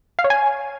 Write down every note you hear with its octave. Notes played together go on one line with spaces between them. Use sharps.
F5
C#5
G#5